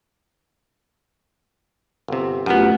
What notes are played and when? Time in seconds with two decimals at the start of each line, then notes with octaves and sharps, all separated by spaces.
2.08 G1 C3
2.46 F#2 A3 B3 F4 G4